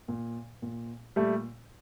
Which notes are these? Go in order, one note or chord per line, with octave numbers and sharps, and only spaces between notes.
A#2
A#2
A#2 G3 A3